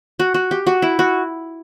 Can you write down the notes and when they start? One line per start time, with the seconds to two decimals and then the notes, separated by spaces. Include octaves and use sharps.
0.19 F#4
0.34 F#4
0.51 G4
0.67 F#4
0.82 E4
0.99 F#4